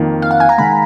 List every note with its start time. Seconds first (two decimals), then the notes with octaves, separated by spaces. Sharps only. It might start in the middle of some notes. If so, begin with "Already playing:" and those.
Already playing: F2 D#3 A#3 F4
0.22 F5
0.31 F#5
0.40 G#5
0.49 A#5
0.58 D#3 G#3 B5